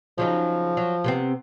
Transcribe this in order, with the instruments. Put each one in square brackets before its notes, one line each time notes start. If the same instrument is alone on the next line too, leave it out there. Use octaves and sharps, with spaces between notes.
[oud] C#3 F#3 D#4 [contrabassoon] F3
[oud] F#3
C3 B3 C4